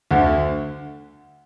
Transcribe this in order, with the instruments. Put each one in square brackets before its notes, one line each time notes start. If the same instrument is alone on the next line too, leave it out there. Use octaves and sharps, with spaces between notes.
[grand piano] D2 D3